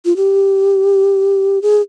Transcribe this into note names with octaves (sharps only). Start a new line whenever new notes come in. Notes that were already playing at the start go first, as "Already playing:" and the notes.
F4
G4
G#4